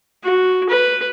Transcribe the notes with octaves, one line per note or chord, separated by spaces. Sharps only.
F#4
B4